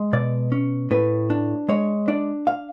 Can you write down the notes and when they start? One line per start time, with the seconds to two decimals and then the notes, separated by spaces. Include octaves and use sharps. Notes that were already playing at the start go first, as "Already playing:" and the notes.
Already playing: G#3
0.13 B2 D5
0.52 C#4
0.91 A2 B4
1.30 D4
1.69 G#3 C#5
2.08 D4 D5
2.47 F5